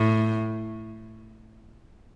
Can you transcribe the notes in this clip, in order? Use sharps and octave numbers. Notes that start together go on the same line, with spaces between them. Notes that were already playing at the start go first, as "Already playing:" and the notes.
Already playing: A2